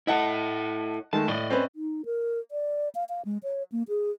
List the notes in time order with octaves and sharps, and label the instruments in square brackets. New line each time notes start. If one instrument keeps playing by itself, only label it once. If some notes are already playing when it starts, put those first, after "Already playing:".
[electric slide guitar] E4 A4 [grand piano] D#5 F#5 A5
[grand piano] D#3 G#3 A3 [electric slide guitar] A5
[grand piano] A2 [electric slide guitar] D5 D#5
[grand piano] C4 C#4 B4
[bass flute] D#4
A#4
D5
F5
F5
G#3
C#5
A#3
G#4